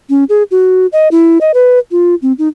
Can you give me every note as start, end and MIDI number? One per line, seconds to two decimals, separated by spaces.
0.10 0.24 61
0.29 0.43 68
0.51 0.87 66
0.93 1.08 75
1.11 1.38 64
1.41 1.52 75
1.54 1.79 71
1.91 2.15 65
2.22 2.33 60
2.39 2.48 63